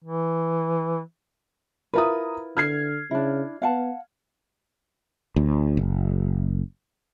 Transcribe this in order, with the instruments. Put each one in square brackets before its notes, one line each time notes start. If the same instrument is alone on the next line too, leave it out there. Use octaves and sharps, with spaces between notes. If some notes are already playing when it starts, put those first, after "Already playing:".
[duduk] E3
[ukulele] E4 F4 B4 [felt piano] A#4 A#5 D#6
[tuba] D3 [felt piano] F6 G#6 C7
[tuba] C#3 [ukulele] D4 E4
[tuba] B3 [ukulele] F5 F#5 A5
[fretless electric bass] D2
F#1